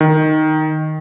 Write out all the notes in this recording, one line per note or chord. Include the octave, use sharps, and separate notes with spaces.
D#3